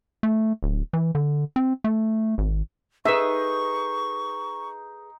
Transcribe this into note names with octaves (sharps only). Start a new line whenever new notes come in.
A3
D1
E3
D3
C4
A3
G#1
D#4 G#4 A4 B4 E5 C#6